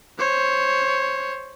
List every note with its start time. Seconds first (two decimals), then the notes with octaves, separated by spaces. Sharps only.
0.18 C5 C#5